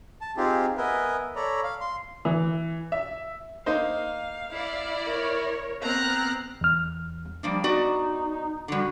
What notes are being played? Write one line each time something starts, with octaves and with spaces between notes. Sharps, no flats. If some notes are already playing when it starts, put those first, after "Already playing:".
A5
C4 D#4 F4 G4 G#4
B3 A#4 B4 D#5 E5 G#5
A4 C#5 D5 A#5 B5
F5
C6
E3
E5
A#3 D#4 C5 F5
E4 D5
A#4 C#5
B3 C4 A#5 F6 F#6
E2 F6
F3 G3 A#3 D4
B3 D#4 F#4 D5
D3 G3 F#4